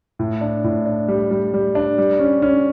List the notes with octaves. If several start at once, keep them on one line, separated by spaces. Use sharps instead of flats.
A2
D4
A2
D4
G3
G3
G3
D4
G3
C#4
C#4